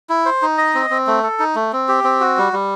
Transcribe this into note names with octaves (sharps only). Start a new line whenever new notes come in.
E4
C5
D#4
D#5
C4
C4
A3
A4
D#4
A3
C4
G4
C4
F#4
G3
G3